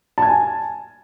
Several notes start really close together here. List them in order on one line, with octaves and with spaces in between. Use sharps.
A5 G#6 G#5